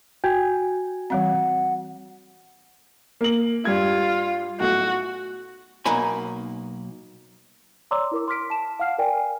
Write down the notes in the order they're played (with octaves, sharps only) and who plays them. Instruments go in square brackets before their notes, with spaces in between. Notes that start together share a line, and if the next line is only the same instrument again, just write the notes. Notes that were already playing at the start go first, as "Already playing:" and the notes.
[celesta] F#4 [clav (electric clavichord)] G5 G#5
[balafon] E3 G3 C4 [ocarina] F#5
[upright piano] A#3 F#7
[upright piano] G2 G3 G#6 [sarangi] F4
[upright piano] B1 A2 [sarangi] F#4
[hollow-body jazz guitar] B1 F#3 A#3 D#4 G#5 B5
[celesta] C#5 D5 A#5 C6 D6 E6
E4 A#4 D6
C6 D6 F6 B6 D7
A5 E7
F5 F#5 F6 C7
A#4 D5 G5 G#5